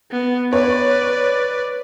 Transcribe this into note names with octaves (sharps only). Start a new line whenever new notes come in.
B3
B4 C#5 D5